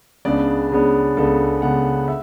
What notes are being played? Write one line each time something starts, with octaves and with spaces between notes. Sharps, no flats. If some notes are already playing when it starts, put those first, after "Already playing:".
C#2 C#3 G#3 B3 D4 D5
C#2 C#3 G#3 B3 D4
C#2 C#3 G#3 B3 D4 A4
C#2 C#3 G#3 B3 D4 F#5
E5